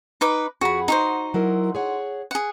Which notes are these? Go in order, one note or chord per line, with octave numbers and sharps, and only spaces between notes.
D#4 B4 D6
F2 F#4 G#4 F#5 B5
D#4 F#4 C5 D#5
F#3 E4 A#4
G#4 C#5 F#5
G#4 F#5